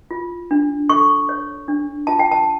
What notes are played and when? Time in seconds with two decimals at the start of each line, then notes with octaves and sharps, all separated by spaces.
0.11 F4
0.51 D4
0.89 A4 C#6
1.29 C#5
1.68 D4
2.07 F4 A5
2.19 G5
2.32 A5